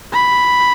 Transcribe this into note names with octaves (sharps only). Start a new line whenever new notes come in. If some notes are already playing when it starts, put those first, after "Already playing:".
B5